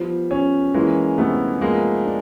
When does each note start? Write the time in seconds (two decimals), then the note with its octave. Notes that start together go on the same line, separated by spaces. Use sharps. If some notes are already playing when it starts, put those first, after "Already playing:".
Already playing: F3 G3 B3
0.31 C#4
0.74 E3 G#3 A#3
1.18 C3 A3 B3
1.61 F3 G#3 A#3
2.05 D4